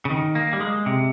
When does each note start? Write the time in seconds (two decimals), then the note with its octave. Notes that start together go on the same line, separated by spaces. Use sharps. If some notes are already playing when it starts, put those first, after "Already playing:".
0.05 C#3
0.10 D#3
0.35 A#3
0.53 G3
0.60 G#3
0.86 C3